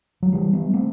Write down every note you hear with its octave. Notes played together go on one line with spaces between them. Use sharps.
F#3
E3 G3
G3 B3
A3 C4